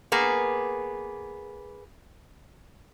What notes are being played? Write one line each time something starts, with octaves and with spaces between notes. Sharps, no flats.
A#3 B3 G#4